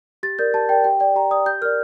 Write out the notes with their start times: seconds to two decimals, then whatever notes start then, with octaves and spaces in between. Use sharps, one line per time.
0.23 G4 A6
0.39 A#4 D5 G6
0.54 G4 A5
0.69 A#4 D5 G5
0.84 G4 G5
1.00 D5 G5
1.15 G4 A#5
1.31 D5 D#6
1.46 G4 G6
1.62 A#4 D5 F6